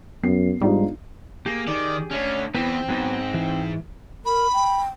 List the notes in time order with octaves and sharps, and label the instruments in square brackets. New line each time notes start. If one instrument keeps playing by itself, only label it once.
[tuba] F#2 [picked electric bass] B3 [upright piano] C7
[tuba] G#2 [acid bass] G3 [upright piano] D4 D#4 F4
[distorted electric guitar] A#3 [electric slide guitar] G4 G#4
[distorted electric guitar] D#3 [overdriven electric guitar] D5
[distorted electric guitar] D3 A3 [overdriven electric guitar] C#4
[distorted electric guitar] E2 [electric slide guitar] B3 B4 [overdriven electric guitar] C4
[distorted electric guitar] G#2 [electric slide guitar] F#3 B3
[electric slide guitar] E3
[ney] A#4 [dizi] B5
[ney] G5